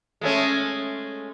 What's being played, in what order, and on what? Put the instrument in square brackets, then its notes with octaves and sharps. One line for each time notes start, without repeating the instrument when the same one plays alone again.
[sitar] G#3 A3 C#4